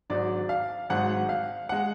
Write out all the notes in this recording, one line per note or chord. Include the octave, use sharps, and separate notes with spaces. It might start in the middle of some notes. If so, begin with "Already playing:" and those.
G#1 G#2 F#3 D5
F5
G#1 G#2 F#3 F#5
F5
G#3 F#5